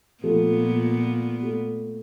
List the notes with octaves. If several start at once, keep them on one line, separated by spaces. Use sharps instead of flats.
A#2 F3 A3 B3 A4
A3